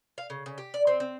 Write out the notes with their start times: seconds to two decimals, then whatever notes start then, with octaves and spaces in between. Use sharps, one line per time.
0.18 F5
0.30 C#3
0.46 C#3
0.58 G4
0.74 D5
0.87 C4
1.00 C4